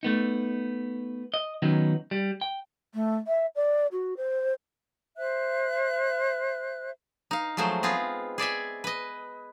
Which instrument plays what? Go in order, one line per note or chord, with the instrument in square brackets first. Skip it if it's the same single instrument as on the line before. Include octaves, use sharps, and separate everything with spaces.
[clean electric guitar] A3 B3 D#4
D#5
D#3 F#3 B3 C#4 D#4
G3
G5
[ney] A3
E5
D5
F#4
C5
[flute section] C5 E5 F#6
[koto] D#4 F5
F3 F#3 G#3 A3 C5
B3 C4 F4 G#4 F5
G#4 D5 E5 G#5
B4 D#5